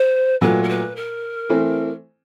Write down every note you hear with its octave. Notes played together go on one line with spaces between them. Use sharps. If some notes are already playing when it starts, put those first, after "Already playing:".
Already playing: C5
A#2 F#3 A3 B4
A#4
B4
A#4
E3 A3 C4